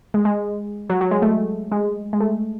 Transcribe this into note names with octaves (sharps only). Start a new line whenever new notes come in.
G#3
G#3
F#3
F#3
G#3
A3
G#3
G#3
A3